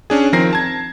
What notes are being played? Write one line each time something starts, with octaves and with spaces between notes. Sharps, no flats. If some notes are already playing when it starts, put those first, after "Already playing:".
C#4 D4 G#4
D#3 F3 C4 A#4 A#6 C7
A5 G#6